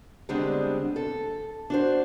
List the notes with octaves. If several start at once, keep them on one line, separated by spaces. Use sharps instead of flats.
D3 G3 G#3 B3 C4 D4
A4
D4 F#4 C5